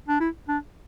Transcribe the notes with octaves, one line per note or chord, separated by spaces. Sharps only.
D4
E4
D4